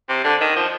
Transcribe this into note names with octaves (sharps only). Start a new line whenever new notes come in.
C3
D3
D#3
F3